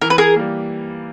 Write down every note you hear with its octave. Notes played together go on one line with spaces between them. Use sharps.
E3 A#4
B4
G#4 A#4
G3 A#3